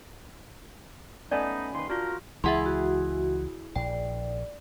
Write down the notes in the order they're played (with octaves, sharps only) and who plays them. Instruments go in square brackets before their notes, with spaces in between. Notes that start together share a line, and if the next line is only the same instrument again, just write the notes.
[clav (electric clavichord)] A3 B3 D#5 [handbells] C#4 G#5 B5 [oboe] D#4 [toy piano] D5
[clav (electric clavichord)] D#2 B4 [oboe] C6
[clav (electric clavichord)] D4 [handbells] F4 F#4 [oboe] A#4
[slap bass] C#2 E3 G#3 [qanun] E4 G#4 [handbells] E5 F#5 C6
[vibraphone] F#4
[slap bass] A#1 [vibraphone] D5 [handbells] G5